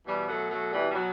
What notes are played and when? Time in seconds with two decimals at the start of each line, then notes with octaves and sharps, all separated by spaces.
0.05 B2 E3 G3
0.28 F#3 A3
0.49 F#3 A3
0.71 E3 G3
0.89 G3
0.93 F#3